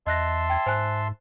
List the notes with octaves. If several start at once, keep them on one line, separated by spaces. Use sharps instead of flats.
E2 D#5 E5 A5 C6 F#6 A#6
G5 G#6
G#2 C5 G#5 F#6